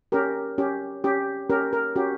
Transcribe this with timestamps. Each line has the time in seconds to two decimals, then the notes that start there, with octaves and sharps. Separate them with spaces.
0.12 C#4 G4 A#4
0.58 C#4 G4
1.04 C#4 G4
1.50 C#4 G4 A#4
1.73 A#4
1.96 C#4 F#4 G4